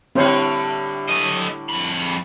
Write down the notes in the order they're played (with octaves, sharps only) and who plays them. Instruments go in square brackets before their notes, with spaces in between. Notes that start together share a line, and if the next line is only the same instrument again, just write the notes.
[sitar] A2 D3 G3 [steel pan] C4 C5 C#5
[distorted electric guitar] A3 D#5
F2 B5